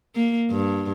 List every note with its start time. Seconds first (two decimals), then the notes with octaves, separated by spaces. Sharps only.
0.16 A#3
0.50 G2